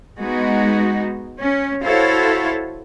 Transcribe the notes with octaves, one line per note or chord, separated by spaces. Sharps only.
G#3 B3 D#4 F#4
C#4
E4 F#4 A4 C5 C#5 F5